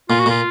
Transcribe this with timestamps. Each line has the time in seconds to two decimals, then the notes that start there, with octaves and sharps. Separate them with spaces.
0.09 A#2 F4
0.20 F#4
0.26 A#2 F4